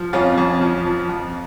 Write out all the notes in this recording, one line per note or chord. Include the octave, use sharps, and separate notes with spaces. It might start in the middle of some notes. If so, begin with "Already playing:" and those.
Already playing: F3
F2 C#4 F4
F2
F3
F3
F2